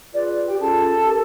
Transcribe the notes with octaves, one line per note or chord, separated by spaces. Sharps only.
F4 G#4 B4 D5
G4 G5
C#4 F4 G#4 A4 A5
D#4 G4 A#4